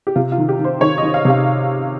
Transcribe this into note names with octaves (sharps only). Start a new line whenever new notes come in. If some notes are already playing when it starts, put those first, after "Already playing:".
G4
C3 F4
F4
D#3
G4
D#3
C5
D#3 C#5
D#5
D#3
F5
C3 F5